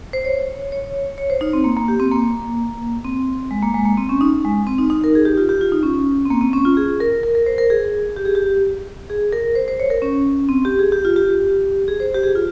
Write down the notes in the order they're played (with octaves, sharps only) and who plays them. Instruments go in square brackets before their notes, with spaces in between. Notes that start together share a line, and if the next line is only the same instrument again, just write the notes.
[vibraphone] C5
C#5
C#5
C#5
C5
D#4
C4
A#3
A#3
G4
C4
A#3
C4
G#3
A#3
G#3
A#3
C4
C#4
D#4
G#3
C4
D#4
D#4
A#4
G#4
G4
F4
G4
F4
D#4
C#4
C4
A#3
C4
C#4
F4
G#4
A#4
A#4
A#4
C5
A#4
G#4
G4
G#4
G4
G#4
A#4
C5
C5
C#5
A#4
C#4
C4
G4
G#4
G4
F4
G4
G#4
C5
G4
G#4
F4